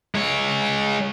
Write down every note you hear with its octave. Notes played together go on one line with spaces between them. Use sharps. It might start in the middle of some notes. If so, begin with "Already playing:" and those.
G#3 C#5